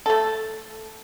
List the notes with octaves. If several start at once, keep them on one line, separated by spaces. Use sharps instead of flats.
A3 A4